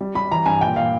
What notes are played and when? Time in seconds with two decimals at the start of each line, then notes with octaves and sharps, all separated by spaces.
0.01 G3
0.15 G3 B5
0.31 E3 A#5
0.46 G2 G#5
0.61 A#2 G5
0.76 A#2 F5